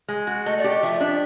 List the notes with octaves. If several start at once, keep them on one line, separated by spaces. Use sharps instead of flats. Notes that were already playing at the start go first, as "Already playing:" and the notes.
G#3
F#4
A3 D#5
D5
G4
D#5
F3 E5
D4